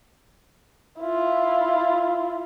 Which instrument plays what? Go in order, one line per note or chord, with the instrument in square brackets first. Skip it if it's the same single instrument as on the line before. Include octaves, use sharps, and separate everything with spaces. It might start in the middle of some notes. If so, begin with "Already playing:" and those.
[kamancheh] E4 F4